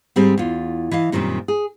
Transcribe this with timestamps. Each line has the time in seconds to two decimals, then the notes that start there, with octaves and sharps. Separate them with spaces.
0.16 G#2 G3 C4 G#4
0.37 E2 F4
0.91 E3 D#5 F5
1.12 F#2 A#2 D#3 G3 C4
1.48 G#4